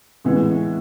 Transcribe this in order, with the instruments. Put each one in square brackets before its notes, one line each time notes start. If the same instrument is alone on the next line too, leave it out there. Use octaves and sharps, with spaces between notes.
[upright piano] A2 E3 G#3 B3